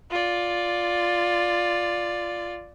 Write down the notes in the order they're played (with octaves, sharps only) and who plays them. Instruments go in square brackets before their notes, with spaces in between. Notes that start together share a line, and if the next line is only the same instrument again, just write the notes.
[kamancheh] F4 D5